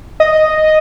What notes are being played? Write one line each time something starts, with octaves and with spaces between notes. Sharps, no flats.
D#5